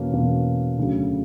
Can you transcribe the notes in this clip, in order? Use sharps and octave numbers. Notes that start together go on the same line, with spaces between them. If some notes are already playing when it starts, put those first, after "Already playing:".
Already playing: E2 B2 A#3 C#4
E2 B2 A#3 C#4
D2 C#3 F#3